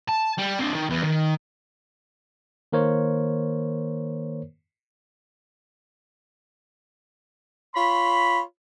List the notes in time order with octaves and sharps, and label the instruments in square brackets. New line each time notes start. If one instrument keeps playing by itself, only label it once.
[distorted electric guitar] A5
G3
C4 D4
D#3
E2
D#3
[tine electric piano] D#3 A#3 A#4 C5 C#5
[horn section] F4 C#5 B5